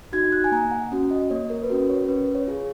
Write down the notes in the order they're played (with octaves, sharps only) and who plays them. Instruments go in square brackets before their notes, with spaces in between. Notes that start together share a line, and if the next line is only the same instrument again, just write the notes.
[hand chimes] D#4 F#4 G#6
F#6
G#5
A#3 A#5
F#5
C#4 F#4
D#5
A#3 C#5
A#4
B4
C#4 F#4 A#4
C#5
C#4 B4
C#5
F4 G#4